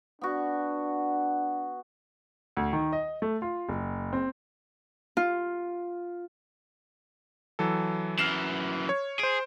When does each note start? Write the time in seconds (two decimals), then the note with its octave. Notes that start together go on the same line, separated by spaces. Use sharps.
0.21 B3 D4 F#4
2.57 D2
2.73 D#3
2.92 D#5
3.22 A3
3.42 F4
3.69 F#1
4.13 C4
5.17 F4
7.59 E3 F#3 A4
8.19 F#2 E3 F6 C7 E7
8.89 C#5
9.19 G#4 C5 D7